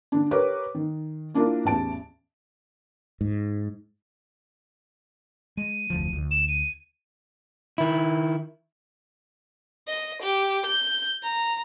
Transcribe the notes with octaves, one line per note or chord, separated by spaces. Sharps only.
D3 D4
G4 A#4 B4 C#5 D6
D#3
A#3 D4 E4 F4 A#4
A1 E2 A5 D7
G#2
G#3 D#7
F1 D2 F3
D2
E7
D#7
D#3 E4
D#5
G4
G6
A#5